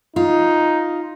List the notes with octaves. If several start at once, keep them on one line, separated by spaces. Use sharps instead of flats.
D#4 F4